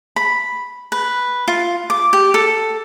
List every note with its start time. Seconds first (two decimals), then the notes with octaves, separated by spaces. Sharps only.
0.16 B5
0.92 B4
1.48 F4
1.90 D6
2.13 G4
2.34 A4